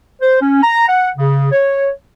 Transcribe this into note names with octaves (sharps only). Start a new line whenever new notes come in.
C5
C#4
A#5
F#5
C#3
C#5